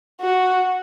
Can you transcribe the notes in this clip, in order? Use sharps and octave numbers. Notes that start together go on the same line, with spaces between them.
F#4